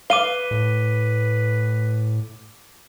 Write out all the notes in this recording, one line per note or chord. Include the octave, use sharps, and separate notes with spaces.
B4 F5 D6 D#7 G7
A2